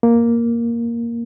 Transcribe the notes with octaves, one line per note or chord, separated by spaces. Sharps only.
A#3